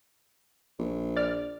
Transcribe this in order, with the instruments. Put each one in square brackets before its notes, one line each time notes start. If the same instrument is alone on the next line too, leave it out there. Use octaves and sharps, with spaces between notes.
[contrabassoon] A#1
[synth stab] D5 F6